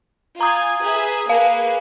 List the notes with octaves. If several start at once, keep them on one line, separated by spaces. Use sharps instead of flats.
F4 G#5 A#5 D#6 G#6
G#4 B4 E5
A#3 G#4 B4 F5